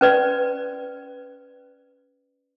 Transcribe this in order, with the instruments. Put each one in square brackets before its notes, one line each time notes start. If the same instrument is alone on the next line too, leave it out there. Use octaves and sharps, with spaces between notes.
[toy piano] C#4 B4 D5